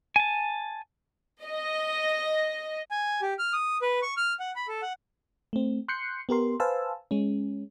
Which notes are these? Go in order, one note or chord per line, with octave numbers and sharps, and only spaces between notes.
G#5 A5
D#5
G#5
G4
F6
D#6
B4
C#6
F6
F#5
B5
A4
F#5
A3 C4
C6 F#6 G6 C7 C#7
B3 G4 A#4 C6
B4 C5 F5 G#5 A5 E6
G#3 C#4